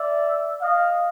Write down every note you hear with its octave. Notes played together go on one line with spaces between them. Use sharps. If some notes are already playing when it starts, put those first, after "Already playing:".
Already playing: D5 E5
D#5 F5